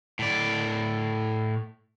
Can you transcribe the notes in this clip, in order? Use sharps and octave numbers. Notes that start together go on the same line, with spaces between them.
A2 D5